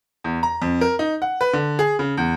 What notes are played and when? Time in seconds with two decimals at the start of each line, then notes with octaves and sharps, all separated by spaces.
0.24 E2
0.43 A#5
0.62 F2
0.81 A#4
0.99 D#4
1.22 F#5
1.41 B4
1.53 D3
1.79 G#4
1.99 C#3
2.17 E2